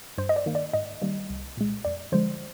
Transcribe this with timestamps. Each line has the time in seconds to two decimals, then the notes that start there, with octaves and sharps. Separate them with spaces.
0.18 G2 C5
0.29 D#5
0.36 D5
0.46 D#3 A#3
0.55 D5
0.73 G#2 D#5
1.02 D#3 G3 A#3
1.30 C2
1.57 A#2 G#3
1.85 F2 D5
2.12 D3 F3 G#3 C5